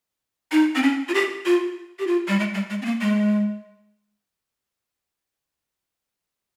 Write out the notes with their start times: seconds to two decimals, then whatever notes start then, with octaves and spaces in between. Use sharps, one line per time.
0.52 D#4
0.75 C4
0.83 C#4
1.09 F4
1.14 G4
1.45 F4
1.99 G4
2.07 F4
2.28 G3
2.39 G#3
2.54 G3
2.70 G#3
2.82 C4
2.85 A#3
3.01 G#3